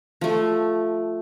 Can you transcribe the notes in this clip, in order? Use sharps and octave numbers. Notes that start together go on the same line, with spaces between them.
F3 A3